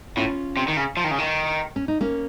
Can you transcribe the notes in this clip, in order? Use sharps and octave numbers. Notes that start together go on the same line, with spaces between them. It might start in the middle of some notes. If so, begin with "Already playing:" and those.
A2 C#4 F4
C3
D#3
C#3
F3
D#3
C#3
D#3
C#4
D#4
A#3 C#4